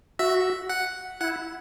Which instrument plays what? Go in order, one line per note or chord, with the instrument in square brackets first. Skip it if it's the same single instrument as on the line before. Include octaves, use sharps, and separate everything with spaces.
[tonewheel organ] F#4 [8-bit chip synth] E5
[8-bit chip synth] F#5
[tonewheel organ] E4 [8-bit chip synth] F#5